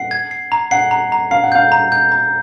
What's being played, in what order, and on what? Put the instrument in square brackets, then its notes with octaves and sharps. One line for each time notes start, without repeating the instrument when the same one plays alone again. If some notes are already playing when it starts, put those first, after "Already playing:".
Already playing: [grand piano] F#5 [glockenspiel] C7
[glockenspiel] G#6
C7
A#5
[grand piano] F#5 [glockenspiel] C7
[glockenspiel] A#5
A#5
[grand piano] F5 [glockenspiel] C7
[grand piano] F#5
[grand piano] F5 [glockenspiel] G6
[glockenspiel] A#5
G6
A#5